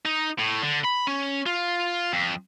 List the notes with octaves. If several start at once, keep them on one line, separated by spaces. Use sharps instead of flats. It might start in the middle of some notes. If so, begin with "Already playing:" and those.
D#4
A2
D3
B5
C#4
F4
F2